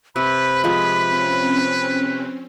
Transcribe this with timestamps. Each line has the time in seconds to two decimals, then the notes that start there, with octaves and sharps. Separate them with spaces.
0.16 C3 B4 B5
0.64 F3 G#3 B4 B6
1.10 C4 C#4